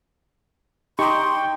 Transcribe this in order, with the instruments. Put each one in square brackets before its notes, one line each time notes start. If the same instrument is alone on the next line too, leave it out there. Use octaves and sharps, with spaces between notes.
[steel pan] D#4 G4 [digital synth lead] G5 [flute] C6 [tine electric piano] C#6